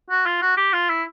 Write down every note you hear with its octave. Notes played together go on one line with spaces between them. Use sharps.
F#4
F4
F#4
G4
F4
E4